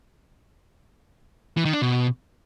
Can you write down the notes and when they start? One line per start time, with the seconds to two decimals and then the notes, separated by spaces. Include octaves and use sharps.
1.57 E3
1.65 D#3
1.73 D4
1.82 B2